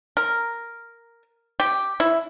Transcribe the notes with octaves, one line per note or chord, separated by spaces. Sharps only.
A#4
G4
E4